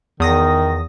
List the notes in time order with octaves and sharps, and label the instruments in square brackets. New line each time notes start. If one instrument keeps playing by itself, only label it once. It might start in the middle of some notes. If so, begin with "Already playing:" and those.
[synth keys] E2 D#6 A#6 [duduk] D#3